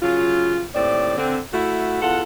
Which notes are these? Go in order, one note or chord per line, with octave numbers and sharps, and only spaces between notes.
C#3 F#3 F4
D#2 A2 C4 D5
D3 C4
A3 E4 F#4
E2 F4 A4 F#5